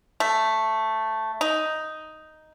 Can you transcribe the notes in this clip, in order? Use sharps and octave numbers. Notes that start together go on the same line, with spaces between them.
A3
D#4